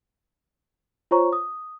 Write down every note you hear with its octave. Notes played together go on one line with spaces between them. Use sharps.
F4 C5 C#5 A#5 C#6
D#6